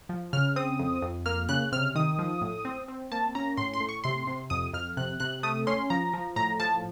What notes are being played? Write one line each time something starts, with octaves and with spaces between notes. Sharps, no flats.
F3
C#3 F6
C4 D#6
F2
F2
A#3 F6
C#3 F#6
C3 F6
D#3 D#6
F3
A2
C4
C4
A#3 A5
C#4 A#5
A2 C6
C6
A2
C#6
C3 C6
C3
F2 D#6
F2 F6
C3 F#6
C3 F#6
A3 D#6
C#4 C6
F3 A#5
F3
A2 A#5
F3 A5